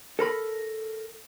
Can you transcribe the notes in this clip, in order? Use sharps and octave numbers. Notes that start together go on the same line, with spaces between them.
A4 A#4 B5